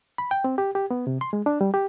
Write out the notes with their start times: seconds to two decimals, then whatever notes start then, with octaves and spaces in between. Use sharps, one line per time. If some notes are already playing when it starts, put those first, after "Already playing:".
0.18 B5
0.31 G5
0.44 C4
0.58 G4
0.75 G4
0.91 B3
1.07 C3
1.21 C6
1.33 G#3
1.46 D4
1.61 G3
1.74 G4